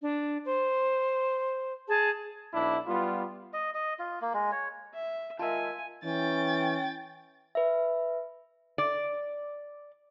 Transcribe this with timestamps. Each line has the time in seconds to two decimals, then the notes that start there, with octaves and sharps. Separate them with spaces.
0.02 D4
0.44 C5
1.89 G#4 A5
2.54 B1 D4 E4
2.87 G3 B3 F4
3.53 D#5
3.75 D#5
3.99 F4
4.21 A#3
4.34 G#3
4.52 C#5
4.93 E5
5.39 F4 A#4 D#5 E5 G#5 A5
6.04 E3 C#4 G5 A6
7.55 B4 E5
8.78 D5